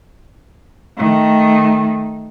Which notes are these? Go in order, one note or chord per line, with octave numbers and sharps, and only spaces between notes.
D#3 A3